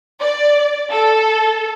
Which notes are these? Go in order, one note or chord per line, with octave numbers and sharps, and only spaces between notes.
D5
A4